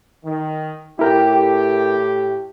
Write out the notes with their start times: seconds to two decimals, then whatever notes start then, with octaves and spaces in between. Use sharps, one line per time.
0.24 D#3
0.99 A2 A3 E4 G4 A#4 G5